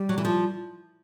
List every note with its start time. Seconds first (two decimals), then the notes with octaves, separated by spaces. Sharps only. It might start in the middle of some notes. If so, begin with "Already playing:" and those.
Already playing: G3
0.09 F#3
0.18 E3
0.25 F3